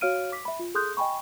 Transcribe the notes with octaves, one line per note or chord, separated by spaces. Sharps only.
F#4 C#5 F5 F6 D7 D#7
D6 B6
E5 B5
F4
G#4 A4 C6 D#6 F#6 G6
D#5 G5 G#5 B5 C#6